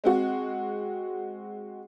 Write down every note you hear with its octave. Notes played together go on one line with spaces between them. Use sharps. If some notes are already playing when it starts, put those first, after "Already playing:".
G#3 C4 F#4